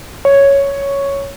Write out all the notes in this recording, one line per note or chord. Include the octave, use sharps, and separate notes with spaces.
C#5